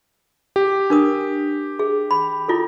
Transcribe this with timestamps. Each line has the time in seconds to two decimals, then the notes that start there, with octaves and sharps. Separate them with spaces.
0.56 G4
0.90 D4 A#4 D#6
1.79 G#4
2.11 B5
2.48 E4 F4 A4